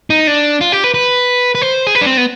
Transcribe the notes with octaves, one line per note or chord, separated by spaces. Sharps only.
D#4
D4
F4
G4
B4
B4
B4
C5
G#4
B4
D4
C4
B3